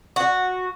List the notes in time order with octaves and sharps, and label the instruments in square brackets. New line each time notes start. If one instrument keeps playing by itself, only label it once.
[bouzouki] F#4